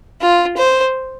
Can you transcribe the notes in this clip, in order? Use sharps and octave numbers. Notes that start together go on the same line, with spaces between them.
F4
C5